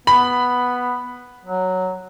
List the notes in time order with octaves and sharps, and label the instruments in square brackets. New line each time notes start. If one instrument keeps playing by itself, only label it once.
[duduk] B3 [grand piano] B5
[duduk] F#3